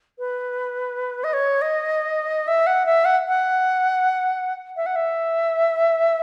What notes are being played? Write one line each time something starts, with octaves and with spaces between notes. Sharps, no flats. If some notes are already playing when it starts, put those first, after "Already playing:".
B4
D#5
C#5
D#5
E5
F#5
E5
F#5
F#5
E5
F#5
E5